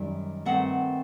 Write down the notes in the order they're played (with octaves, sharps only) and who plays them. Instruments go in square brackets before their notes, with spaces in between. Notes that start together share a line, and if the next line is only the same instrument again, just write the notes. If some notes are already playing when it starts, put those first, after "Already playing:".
Already playing: [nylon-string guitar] F#2 D#3 G3
G2 D#3 A3 C4 F#5